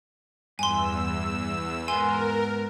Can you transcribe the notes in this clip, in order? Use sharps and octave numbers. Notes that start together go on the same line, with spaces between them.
E2 G2 G#5 C6 E6
G#2 B3 A#4 G#5 C6